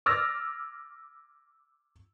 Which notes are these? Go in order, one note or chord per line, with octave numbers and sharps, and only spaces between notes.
D6 E6 F6 A6 A#6